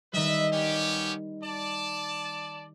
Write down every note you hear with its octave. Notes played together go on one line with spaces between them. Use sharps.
D#3 G3 B4 D#5 E5
B3 C#4 G4
D5 A5